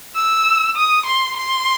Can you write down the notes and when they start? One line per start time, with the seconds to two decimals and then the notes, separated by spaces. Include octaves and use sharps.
0.16 E6
0.76 D#6
1.06 C6
1.36 C6